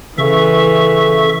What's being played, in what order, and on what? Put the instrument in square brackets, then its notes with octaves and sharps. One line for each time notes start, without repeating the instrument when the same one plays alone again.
[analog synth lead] C#3 [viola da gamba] E3 [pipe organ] A4 E5 C#6